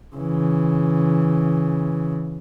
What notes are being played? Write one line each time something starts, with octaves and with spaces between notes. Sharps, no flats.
C#3 E3